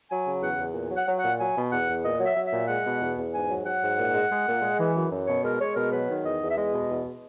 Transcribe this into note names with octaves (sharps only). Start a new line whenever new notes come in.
F#3 G#5
C#3
E2 F#5
E2
A#2
F#3
F#5
F#3
F#5
A#2
F#3 G#5
B2
E2 F#5
E2
A#2 D#5
F#3
E5
F#3
A#2 E5
G#3 F#5
B2
E2
E2
G#2 G#5
F#3
F#3 F#5
G#2
A#2
G#3
G#3
A#2
G#3
E3
F#2
F#2
B2 C#5
G#3 A#4
G#3 C#5
B2 A#4
F#3 B4
D#3
E2 D#5
E2
E5
G#3 D#5
B2
E2